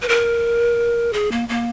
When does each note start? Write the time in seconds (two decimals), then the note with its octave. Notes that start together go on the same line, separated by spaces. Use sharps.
0.02 B4
0.09 A#4
1.13 G#4
1.32 A#3
1.49 A#3